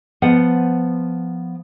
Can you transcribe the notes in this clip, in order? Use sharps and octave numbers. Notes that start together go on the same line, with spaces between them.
F3 B3 C5 F#5